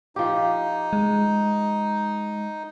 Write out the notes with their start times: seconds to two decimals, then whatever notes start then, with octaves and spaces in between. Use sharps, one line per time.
0.16 F3 D#4 G4
0.93 G#3